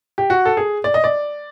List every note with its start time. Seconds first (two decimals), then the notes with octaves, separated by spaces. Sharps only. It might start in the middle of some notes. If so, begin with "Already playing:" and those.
0.18 G4
0.30 F#4
0.45 A4
0.57 G#4
0.84 D5
0.94 D#5
1.04 D5